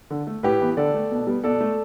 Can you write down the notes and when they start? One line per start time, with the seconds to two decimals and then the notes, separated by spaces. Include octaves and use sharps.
0.10 D3
0.27 A3
0.43 A2 G4 B4
0.61 E3 B3
0.77 D3 A4 D5
0.94 A3
1.11 B2
1.27 G3 B3
1.44 B2 A4 D5
1.60 A3